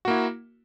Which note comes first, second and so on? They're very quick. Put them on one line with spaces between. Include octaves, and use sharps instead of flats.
F#4 A#3 E4